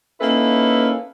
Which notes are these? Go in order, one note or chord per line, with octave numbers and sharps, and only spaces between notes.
A#3 C#4 D#4 E4 A4 B4